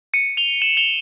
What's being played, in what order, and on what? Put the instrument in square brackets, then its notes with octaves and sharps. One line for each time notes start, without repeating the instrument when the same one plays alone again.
[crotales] C#7 D#7
F7 G7
E7 F#7
F7 G7